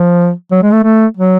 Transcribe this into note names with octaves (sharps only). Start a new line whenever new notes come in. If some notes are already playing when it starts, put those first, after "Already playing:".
Already playing: F3
F#3
G#3
A3
A3
F#3